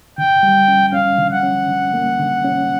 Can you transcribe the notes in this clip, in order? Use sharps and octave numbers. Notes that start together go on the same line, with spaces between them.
D3 G5
G3
C#4
C#4 F5
D3
F#5
C#4
D3
A#3
D3
C#4